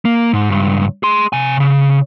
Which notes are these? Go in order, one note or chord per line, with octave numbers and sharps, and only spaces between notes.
A#3
G#2
C#2 G2
G#4 C6
C3 G#5
C#3